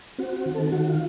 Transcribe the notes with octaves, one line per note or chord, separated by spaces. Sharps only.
C4 F#4
F#4
D#3
A4
D#3 F#4
F4